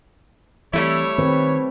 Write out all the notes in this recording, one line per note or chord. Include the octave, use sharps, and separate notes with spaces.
E3 G3 A3 C4 E4 C#5
D#3 C4 B4